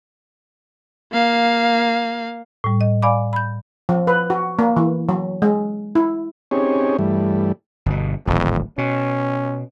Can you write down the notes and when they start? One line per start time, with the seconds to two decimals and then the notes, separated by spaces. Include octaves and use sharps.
1.12 A#3 F5
2.64 A2 G3
2.81 D#5
3.02 D5 F5 G#5 B5 D6
3.33 B5 G6
3.89 F3
4.07 B4
4.30 F#4
4.59 A#3
4.76 E3
5.09 F#3
5.42 G#3
5.95 E4
6.51 C4 C#4 D#4 G4 G#4 C#5
6.99 G2 E3 G3 A3
7.86 G1 B2
8.27 D1 G#1 F2
8.78 B2 C#4